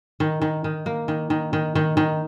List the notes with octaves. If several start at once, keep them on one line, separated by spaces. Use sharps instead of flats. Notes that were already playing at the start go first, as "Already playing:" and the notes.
D#3
D#3
D#3
A#3
D#3
D#3
D#3
D#3
D#3